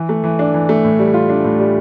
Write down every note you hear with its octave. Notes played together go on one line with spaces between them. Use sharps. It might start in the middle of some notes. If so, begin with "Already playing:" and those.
Already playing: E3
A3
E3
D4
E3
A3
A2
G3
F4
D4
A2
G3